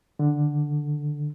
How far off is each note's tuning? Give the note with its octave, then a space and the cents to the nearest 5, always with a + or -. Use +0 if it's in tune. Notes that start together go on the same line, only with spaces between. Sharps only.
D3 +5